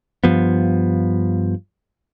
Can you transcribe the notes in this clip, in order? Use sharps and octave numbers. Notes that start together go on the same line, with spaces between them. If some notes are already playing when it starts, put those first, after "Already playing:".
G2 F3 B3